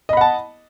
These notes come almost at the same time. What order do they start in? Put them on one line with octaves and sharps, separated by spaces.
D#5 B5 F#5 A5